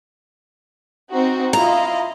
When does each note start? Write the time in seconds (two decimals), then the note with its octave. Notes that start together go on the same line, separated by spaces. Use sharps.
1.12 C4 D#4 F#4
1.53 E4 F4 D#5 A#5